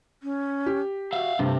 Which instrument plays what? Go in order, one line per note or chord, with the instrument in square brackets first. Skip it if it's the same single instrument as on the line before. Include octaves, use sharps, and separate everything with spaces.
[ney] C#4
[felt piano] G4
[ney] F#4 [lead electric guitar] E5 F5
[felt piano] G2 [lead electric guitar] C3 [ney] A3